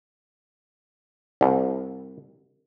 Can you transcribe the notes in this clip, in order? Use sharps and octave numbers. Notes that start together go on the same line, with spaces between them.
C2